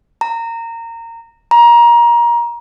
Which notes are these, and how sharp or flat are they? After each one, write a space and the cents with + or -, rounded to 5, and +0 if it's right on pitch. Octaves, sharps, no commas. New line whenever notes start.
A#5 -20
A#5 +25